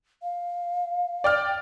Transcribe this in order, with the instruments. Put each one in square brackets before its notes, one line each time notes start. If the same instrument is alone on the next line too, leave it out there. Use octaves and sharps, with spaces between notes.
[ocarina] F5
[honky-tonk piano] D5 G5 F6